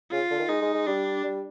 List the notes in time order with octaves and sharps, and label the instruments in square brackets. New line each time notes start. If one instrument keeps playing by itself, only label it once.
[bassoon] C#3 [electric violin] F4
[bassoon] D3
D#3
[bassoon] G#3 [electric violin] D#4
[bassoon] G#3
G#3
[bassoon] G3 [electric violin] D4
[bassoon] G3